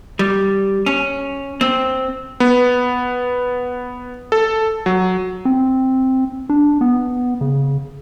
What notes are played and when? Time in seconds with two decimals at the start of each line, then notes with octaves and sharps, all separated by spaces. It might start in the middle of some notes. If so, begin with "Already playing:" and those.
0.19 G3
0.86 C#4
1.61 C4
2.40 B3
4.32 A4
4.86 F#3
5.45 C4
6.49 D4
6.81 B3
7.41 C#3